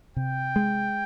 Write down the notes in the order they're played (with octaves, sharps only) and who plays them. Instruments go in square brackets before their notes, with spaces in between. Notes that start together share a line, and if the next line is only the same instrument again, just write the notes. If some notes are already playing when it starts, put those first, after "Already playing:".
[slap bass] C3 [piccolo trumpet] G5
[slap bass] G#3